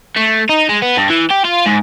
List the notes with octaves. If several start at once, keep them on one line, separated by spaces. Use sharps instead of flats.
A3
D#4
G#3
B3
G2
E3
G4
F4
G#2